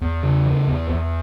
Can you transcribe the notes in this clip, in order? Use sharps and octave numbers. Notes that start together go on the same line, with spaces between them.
E2
C#3
E3
E2
E2